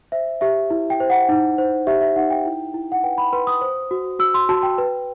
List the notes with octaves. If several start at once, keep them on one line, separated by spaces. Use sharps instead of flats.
C5 E5
G4 E5
E4
G5
C5
F#5
D#4
C5
G4 E5
E5
D#4 F#5
G5
E4
E4
F#5
B4 G5
B5
B4 C6
D#6
C5
F#4
F#4 E6
C6
F#4 A5
G5
B4